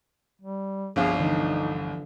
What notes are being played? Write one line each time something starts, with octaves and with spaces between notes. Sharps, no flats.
G3
G1 C2 F3 D4 G#4 F5
D3 E3 D#4